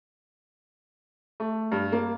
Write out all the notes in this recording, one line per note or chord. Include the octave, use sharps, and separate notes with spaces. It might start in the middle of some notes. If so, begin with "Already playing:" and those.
A3
G2
A#3